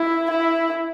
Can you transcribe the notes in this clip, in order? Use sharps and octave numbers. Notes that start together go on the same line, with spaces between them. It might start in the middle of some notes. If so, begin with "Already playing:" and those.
Already playing: E4
E4